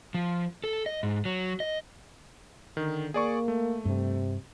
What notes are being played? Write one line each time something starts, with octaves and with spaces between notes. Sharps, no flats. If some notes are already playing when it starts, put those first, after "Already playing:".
F3
A4
D#5
G#2
F#3
D#5
D3 D#3
A#3 G#4 D5 C#6
A3
G2 C3